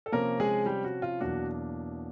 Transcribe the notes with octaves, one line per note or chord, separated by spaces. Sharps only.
A4
C3 F3 A#3 C#4 A#4
G#3 G#4
G3 G4
F#4
F4
E2 B2 F#3 A#3 D4 F#4